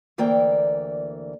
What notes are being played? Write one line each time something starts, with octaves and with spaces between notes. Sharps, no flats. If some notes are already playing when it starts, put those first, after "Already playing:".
D2 E3 A#3 D5 G5